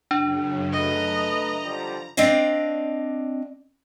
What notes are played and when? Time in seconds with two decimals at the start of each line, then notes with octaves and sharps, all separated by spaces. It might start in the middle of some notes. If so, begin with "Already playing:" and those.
0.11 F#2 C#3 D4
0.73 A3 B4 D#5 A#5
1.62 D3 F3 G3
2.17 C4 D4 D5 D#5 F5